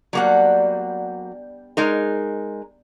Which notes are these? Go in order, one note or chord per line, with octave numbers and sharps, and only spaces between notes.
F#3 G3 A#3 B3 D4 F#5
G#3 D#4 A#4